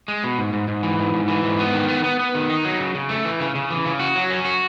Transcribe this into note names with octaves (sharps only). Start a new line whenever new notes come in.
G#3
B2
G#2
G#2
G#2
E3
G#2
G#2
E3
G#2
B3
D#3
B3
B3
B3
D#3
D#4
F#3
C#3
C#3
A3
E3
C#3
C#3
E3
C#3
F#4
F#3
C#4
F#4